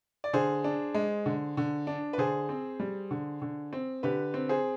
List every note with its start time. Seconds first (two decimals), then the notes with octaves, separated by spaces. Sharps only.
0.24 D5
0.33 D3 G#4 C5
0.64 D4
0.94 G#3
1.26 D3
1.57 D3
1.87 D4
2.13 B4
2.18 D3 G#4 C5
2.49 C4
2.80 G3
3.11 D3
3.42 D3
3.73 C4
4.03 D3 G4 B4
4.34 C4
4.49 G#4 C5